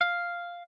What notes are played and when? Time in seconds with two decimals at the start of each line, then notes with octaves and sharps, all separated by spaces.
0.01 F5